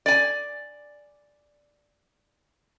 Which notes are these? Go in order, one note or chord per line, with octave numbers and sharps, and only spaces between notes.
D5 G#5